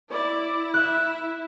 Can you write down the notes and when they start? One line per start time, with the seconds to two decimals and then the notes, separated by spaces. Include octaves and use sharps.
0.11 E4 D5
0.74 E5 F#6